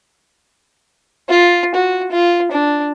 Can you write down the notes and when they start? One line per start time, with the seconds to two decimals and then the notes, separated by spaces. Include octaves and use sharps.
1.29 F4
1.75 F#4
2.12 F4
2.52 D4